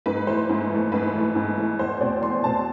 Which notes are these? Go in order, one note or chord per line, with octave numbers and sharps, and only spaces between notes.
G#2 B4
E3 A3 C5
G#2
E3 A3
G#2 B4
E3 A3
G#2
E3 A3
E2 C5
B2 A3 C4 D5
E2 C6
B2 A3 C4 A5